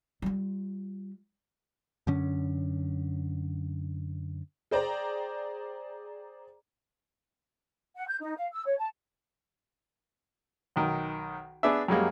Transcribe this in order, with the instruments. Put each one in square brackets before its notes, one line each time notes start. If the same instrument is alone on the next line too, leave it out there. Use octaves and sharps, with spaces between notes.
[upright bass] G3 F4
[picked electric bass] F#2 D3 C#4
[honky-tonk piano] G#4 C5 D5 G5 A#5
[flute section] F#5
G6
D#4
F5
E6
C#5
A5
[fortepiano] B1 D#3
B3 D4 G#4 B4 D5 E5
F#2 G3 G#3 A#3